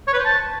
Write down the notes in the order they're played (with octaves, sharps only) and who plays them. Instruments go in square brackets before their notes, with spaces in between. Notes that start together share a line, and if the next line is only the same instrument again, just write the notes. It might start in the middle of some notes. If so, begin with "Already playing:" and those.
[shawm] C#5
B4
C5
A5